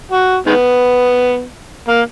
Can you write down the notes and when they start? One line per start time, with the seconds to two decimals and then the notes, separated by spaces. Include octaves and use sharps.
0.11 F#4
0.46 D#3 G#3 B3
1.88 A#3